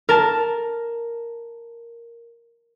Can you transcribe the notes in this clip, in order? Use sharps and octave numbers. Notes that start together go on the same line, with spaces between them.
A#4 A5